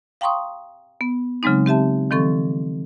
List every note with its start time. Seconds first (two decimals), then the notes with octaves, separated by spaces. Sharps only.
0.21 F5 G5 A#5 C6 C#6 D#6
1.01 B3
1.43 C#3 F#3 G#3 C4 D#4
1.66 C4 G4 E5 A5
2.11 D#3 F3 C4 A4 C#6